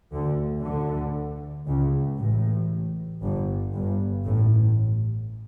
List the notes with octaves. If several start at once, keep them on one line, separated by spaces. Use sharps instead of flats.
D2 D3
D2 D3
C#2 C#3
A1 A2
G1 G2
G1 G2
A1 A2